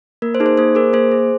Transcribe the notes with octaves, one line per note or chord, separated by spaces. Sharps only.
A#3 A#4
C5
D#4 G#4
C5
A#3 C5
G#4 A#4
A#3 C5
G#4